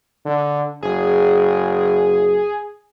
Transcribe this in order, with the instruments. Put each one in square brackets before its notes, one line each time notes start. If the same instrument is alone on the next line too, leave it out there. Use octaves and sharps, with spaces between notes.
[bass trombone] D3
[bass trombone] F#1 [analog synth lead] G#4